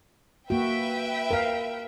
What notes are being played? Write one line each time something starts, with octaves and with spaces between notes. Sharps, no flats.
A#3 F#4 B4 E5 G5
A#4 F5